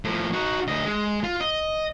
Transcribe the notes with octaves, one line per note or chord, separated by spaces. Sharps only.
A2 F3
D#4 F#4
D2 D#5
G#3
F4
D#5